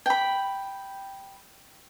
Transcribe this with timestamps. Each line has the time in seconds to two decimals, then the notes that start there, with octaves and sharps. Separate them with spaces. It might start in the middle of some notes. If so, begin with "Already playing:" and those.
0.06 G5 B5